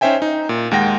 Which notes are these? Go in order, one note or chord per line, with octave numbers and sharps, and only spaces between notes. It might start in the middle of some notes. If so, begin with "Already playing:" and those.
C#4 D#4 C5 E5 G5 G#5
D#4
A#2
D#2 G#3 F#5 G5 A#6